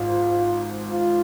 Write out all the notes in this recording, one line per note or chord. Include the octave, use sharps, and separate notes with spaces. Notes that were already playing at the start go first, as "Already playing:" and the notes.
Already playing: G#1 G#2 F4
F4